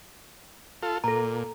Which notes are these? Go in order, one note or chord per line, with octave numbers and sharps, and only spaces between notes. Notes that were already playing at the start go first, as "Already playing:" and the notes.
F4 A4
A#2 A4 A#5